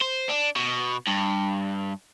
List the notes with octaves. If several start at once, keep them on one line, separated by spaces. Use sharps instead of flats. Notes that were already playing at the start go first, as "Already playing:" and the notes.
C5
D4
B2
G2